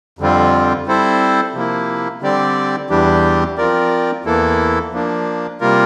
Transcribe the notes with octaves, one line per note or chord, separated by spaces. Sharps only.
F2 D3 G3 C4 F4
G3 C4 E4 A4 C5
C3 F3 A#3 E4
D3 G3 C4 G4 D5
E2 E3 G3 D4 G4
F3 C4 F4 A#4 D5
E2 E3 A#3 E4 A4
F3 A#3 D4
C3 G3 A#3 F4 A#4